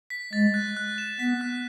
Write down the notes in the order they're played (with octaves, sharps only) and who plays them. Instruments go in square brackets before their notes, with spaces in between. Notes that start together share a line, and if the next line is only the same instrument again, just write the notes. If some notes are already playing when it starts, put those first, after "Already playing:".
[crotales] B6
[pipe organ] G#3 [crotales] A6
[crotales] F#6
F#6
E7
[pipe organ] B3 [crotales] B6
[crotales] F#6